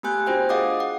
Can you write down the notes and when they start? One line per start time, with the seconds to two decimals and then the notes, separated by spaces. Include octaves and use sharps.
0.03 A3 B3 G4 G#5 F#6 G6
0.26 D4 F4 F#4 C5 G5 G6
0.49 G#4 D#5 F5 F#5 D6 D#6
0.80 F#5